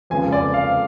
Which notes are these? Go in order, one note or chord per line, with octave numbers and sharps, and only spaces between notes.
F2 C#3 G#3 B3 G#5
D5
F5